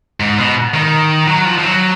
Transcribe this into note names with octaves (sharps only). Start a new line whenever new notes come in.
G#2
B2
D#3
F#3
F3
F3
F#3